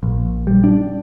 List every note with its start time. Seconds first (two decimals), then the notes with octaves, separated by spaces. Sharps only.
0.03 A#1
0.47 G3
0.64 D4